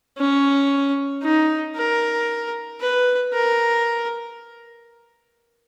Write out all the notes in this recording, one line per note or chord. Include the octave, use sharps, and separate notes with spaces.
C#4
D#4
A#4
B4
A#4